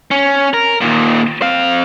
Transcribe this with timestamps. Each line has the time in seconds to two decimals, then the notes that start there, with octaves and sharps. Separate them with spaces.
0.11 C#4
0.54 A#4
0.81 D#2 A#2
1.42 C4 F5